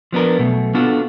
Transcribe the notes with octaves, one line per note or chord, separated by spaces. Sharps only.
F3 B3 D4 A#4
B1 B2 A3
B3 D4 F4 F#4 A4 F#5